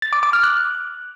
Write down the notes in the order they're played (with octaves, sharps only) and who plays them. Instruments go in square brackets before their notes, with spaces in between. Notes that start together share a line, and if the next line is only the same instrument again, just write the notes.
[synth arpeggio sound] A6
D6
D6
F6
F#6